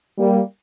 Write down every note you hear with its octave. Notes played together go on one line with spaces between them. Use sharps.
G3 A#3